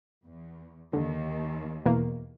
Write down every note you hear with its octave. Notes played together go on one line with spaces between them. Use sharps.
E2
D#2 D3
E2 B2 A#3